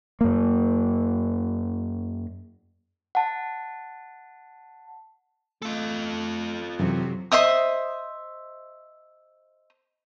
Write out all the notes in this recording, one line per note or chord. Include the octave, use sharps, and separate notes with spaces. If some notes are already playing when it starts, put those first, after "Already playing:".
F#2 A#3
F#5 A5
A3 F4 A4
F#2 C3 E3 F#3
C5 D#5 E5 D#6